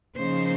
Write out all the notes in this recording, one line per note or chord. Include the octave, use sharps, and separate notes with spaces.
C#3 F3 A#3 D#4 C5